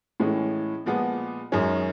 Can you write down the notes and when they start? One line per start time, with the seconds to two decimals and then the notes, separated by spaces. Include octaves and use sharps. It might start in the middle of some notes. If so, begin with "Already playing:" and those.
0.20 A2 E3 G#3 C#4
0.86 A#2 F3 G#3 B3
1.52 F#2 D#3 G#3 C#4